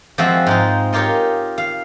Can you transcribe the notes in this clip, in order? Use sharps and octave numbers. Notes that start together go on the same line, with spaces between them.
F3 G#3 C4 F#4 E5
G#2 D#4 F4
D#4 F4 G4 A#4 C#5
F5